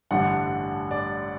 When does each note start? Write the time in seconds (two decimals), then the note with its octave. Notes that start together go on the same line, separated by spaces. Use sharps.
0.11 A1 G2 D3 A3 D4 F#5
0.91 D5